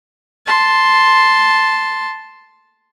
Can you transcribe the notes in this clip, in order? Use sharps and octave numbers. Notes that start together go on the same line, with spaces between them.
A5 C6